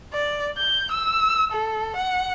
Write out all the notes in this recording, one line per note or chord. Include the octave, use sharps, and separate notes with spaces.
D5
G6
E6
A4
F#5